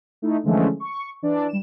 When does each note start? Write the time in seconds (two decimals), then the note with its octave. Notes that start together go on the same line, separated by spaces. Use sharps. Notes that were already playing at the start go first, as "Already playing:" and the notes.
0.22 A3 D#4 E4
0.44 D3 E3 F3 G#3 A3 C#4
0.80 C#6
1.22 E3 D4 D5
1.49 G3 E7